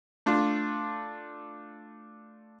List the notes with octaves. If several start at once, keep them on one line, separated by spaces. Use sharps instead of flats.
A3 D4 F4